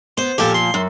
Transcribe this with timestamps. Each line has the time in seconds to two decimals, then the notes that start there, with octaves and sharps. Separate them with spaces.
0.18 B3 C5
0.38 A#2 F3 G4 A4
0.54 C6
0.74 F#2